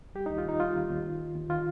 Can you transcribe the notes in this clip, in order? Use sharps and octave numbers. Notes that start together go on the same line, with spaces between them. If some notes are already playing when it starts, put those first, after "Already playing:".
G3 G4
D#2 D#4
F4
D#2 D#4
G3 F4
D#2
D#2
D#3
D#2
D#2
D#3 F4